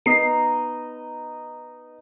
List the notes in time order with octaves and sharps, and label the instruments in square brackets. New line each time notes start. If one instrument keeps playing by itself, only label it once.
[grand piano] B3 [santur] D#4 D#5 A#5 [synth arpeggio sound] C7